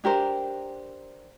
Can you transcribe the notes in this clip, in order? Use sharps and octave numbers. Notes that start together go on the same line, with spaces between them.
D4 G4 A#4 C5